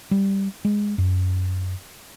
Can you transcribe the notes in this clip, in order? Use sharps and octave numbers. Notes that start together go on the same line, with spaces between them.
G3
G#3
F#2